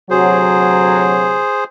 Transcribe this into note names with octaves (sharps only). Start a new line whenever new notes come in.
D2 C3 F#3 G#4 C5